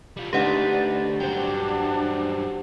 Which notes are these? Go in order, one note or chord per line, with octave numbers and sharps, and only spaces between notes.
G3 F4
D2 D4 D#4 G4 B4 D5 F#5
G2 F#3 C5 G5
D4